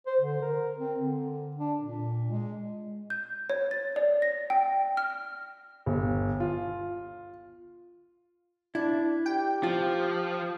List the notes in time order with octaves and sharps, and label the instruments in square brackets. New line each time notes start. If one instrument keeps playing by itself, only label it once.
[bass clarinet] C5
D3
A#4
C4
D3
D4
A#2
G#3
[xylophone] G6
C#5
A6
D5
A#6
G5
F6
[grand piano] G1
F4
[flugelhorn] D4 [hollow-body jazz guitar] E4
[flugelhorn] G4 [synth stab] G5
[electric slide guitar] F3 [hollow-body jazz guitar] F4